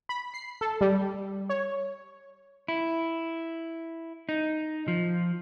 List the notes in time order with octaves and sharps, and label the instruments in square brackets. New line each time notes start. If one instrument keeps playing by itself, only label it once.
[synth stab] B5
C7
A4
G3
C#5
[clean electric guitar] E4
D#4
F3